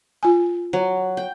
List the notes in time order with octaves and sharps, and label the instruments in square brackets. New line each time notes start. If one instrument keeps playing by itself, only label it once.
[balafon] F4 G#5
[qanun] F#3
G5